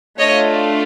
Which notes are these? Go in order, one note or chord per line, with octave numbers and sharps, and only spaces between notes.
A3 D4 F4 C#5 D#5